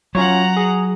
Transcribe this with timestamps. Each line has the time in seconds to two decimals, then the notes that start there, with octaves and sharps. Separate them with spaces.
0.15 F#3 C#4 F4 C#5 F#5 A#5
0.57 G#4